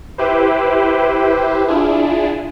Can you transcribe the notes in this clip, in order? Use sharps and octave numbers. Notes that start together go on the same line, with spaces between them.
E4 G4 B4 C5
D4 E4 F4 G#4